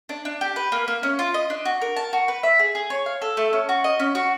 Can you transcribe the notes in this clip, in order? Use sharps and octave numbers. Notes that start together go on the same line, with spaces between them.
D4
D4
G4
B4
A#3
A#3
C#4
F4
D#5
D4
F#4
A#4
A5
F#4
B4
E5
G#4
G#4
C#5
F5
A4
A3
C#4
F#4
D#5
C#4
F#4